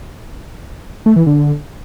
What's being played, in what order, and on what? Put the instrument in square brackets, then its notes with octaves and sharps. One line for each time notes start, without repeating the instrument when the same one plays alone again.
[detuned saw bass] A3
E3
D3